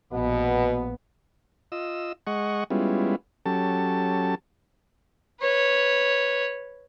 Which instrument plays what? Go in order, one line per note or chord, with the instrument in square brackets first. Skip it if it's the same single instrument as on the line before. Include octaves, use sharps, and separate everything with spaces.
[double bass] A#1 B3 [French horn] B2
[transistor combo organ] F4 D#5 E6
G#3 D#5 F#5 C#6
G3 G#3 B3 C#4 E4 F4
F#3 C#4 G4 A4 A5
[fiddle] B4 C#5